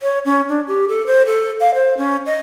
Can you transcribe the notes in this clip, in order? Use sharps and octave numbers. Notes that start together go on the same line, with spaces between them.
C#5
C#4
D4
G4
A4
C5
A4
F5
C5
C#4
D#5